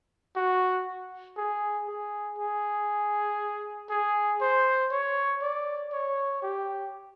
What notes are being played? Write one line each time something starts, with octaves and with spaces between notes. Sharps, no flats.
F#4
G#4
G#4
G#4
G#4
C5
C#5
D5
C#5
G4